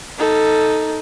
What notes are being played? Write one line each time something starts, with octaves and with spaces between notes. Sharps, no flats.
D#4 A4